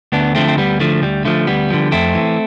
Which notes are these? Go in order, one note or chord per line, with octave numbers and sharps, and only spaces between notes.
D2 B3 D4
D3 F3 A3 C4
C4
D2 G3 B3
D3 F3 A3
D2 G3
D3 F3 A3
D2 G3 B3
D3 F3
F2 A3 C4
E3